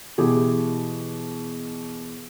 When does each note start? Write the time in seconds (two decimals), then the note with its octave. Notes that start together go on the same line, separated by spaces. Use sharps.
0.18 B2 E3 G4 G#4